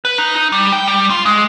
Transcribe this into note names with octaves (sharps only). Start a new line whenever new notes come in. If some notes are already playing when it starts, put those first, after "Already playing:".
B4
D#4
D#4
G3
G5
G3
F4
G#3